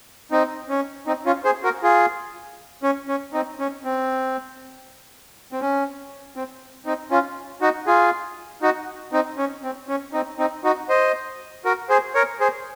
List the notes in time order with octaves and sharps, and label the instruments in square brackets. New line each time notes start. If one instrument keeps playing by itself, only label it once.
[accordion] C4 D#4
C#4
C4 D#4
C#4 F4
G#4 C5
F#4 A#4
F4 G#4
C#4
C#4
C4 D#4
C#4
C4
C4
C#4
C4
C4 D#4
C#4 F4
D#4 F#4
F4 G#4
D#4 F#4
C4 D#4
C#4
C4
C#4
C4 D#4
C4 D#4
D#4 F#4
C5 D#5
F#4 A#4
G#4 C5
A#4 C#5
G#4 C5